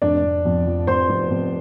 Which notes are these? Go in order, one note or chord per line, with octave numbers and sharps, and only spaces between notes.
F1 D4 D5
F1
F2
F3
F1 C5 C6
F1
F2